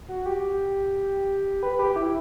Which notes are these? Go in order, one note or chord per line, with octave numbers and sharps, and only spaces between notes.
F#4
G4
B4
G4
E4